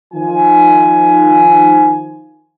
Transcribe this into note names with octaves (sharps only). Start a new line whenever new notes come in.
D#3 F3 G#5